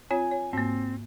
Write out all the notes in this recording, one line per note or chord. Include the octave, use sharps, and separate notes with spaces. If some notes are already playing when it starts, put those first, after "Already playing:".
C4 F4 C#5 G#5
C#5
G#2 A#3 C4